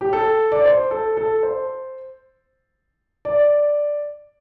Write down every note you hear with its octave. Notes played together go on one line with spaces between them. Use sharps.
G4
A4
D5
C5
A4
A4
C5
D5